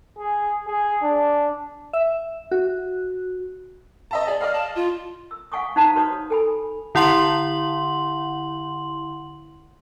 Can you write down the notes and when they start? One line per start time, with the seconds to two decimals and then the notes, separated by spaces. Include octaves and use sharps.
0.18 G#4
0.68 G#4
1.03 D4
1.93 E5
2.51 F#4
4.11 D#5 E5 A5
4.27 G#4 D5
4.41 D5 D#5 F5 F6
4.53 A5
4.75 F4
5.31 E6
5.52 F5 F#5 G#5 C#6 D#6
5.76 D#4 C5 F5 A5 A#5
5.95 F#4 B4 C#5 D#6
6.30 A4 G#5 B5
6.95 D3 E4 F#5 C6 F#7